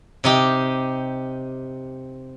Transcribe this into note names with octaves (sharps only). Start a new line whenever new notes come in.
C3 D#4 G4